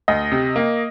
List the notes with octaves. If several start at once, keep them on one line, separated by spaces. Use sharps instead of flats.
D2 D#5
C3
A#3